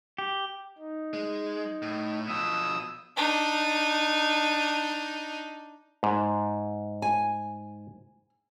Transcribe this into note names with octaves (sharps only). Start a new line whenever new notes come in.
G4
D#4
G#3
A2
B2 F3 D#6 E6
D4 D#4
G#2
G#5